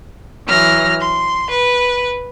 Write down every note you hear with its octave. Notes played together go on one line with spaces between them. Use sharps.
E3 F#3 F6 A#6
C6
B4